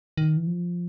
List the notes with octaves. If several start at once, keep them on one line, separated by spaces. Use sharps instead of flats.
D#3
E3
F3